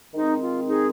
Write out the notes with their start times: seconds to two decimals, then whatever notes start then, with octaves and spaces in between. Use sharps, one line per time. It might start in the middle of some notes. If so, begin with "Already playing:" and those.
0.14 D#3 G#3 C4 D#4
0.41 F4
0.68 D#4 G#4